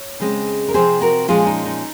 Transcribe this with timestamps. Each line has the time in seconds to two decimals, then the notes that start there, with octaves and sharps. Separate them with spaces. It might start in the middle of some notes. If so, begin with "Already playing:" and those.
Already playing: C#5
0.20 C#3 G#3 C4
0.68 A#4
0.74 C3 F3 C4 G#4 C5
1.01 F#4 A#4
1.28 A#2 F3 G#3 C#4 F4 G#4
1.47 D#4
1.65 D#4